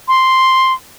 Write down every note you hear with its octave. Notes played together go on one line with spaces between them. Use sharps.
C6